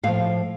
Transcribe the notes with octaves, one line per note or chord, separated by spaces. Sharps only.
A2 F3 F5